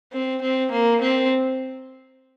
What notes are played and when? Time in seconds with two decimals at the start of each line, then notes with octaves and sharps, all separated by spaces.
0.13 C4
0.42 C4
0.72 A#3
1.02 C4